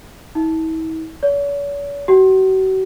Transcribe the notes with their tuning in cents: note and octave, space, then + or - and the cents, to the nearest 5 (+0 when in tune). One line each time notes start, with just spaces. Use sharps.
E4 -45
C#5 +45
F#4 +40